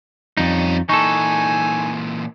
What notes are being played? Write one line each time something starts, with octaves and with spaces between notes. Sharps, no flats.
F2 G3 C#4 D#4
A#2 E3 D#4 A4 G#5 A5 C#6